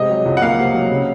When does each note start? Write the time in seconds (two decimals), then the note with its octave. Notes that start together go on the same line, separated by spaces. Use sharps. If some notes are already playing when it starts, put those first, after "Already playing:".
Already playing: C3 G#3 D#5
0.09 F#3
0.26 C#2
0.37 F#5
0.42 A#3 F5
0.58 C3
0.74 F#3
0.91 C#3